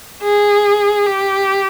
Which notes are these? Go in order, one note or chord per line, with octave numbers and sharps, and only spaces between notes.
G#4
G4